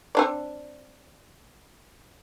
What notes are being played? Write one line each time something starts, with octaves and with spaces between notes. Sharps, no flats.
C4 D4 D5